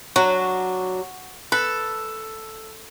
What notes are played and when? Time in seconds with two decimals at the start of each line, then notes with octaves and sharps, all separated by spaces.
0.16 F#3 D4 F#4
1.52 A4 B4